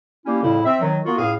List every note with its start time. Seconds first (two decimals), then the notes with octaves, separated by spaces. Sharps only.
0.26 G3 A#3 C#4 E4 G4
0.42 F2 A2 C#3 G3 E4
0.65 C4 E5
0.81 D#3 F#3
1.05 A#3 B3 F4 F#4
1.18 C#2 A2 G#4 F5